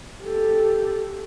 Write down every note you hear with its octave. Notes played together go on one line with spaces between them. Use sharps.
G4 A4